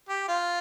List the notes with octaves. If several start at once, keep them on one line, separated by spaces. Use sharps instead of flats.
G4
F4